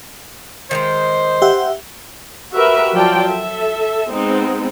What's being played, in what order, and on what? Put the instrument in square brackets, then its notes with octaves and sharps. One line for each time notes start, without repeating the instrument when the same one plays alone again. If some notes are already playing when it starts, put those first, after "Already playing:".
[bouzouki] D#3 G3 G#3 [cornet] C5
[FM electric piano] G4 E5 F#5
[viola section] F#4 G4 A#4 B4 E5
F3 F#3 F4 D5 G5 A5
A4 E5
G#3 B3 C4 D#4